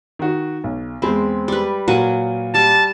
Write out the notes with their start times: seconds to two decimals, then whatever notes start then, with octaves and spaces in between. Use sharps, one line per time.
0.19 D#3 F#4
0.64 B1
1.02 E2 G#3 C4 B5
1.48 G3 B4
1.88 A#2 F#3 F#4 A#4 D#7
2.54 G3 A5